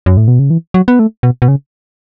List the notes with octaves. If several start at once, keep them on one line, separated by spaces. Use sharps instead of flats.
F#2
A2
B2
C#3
E3
F#3
B3
A3
B2
B2
C#3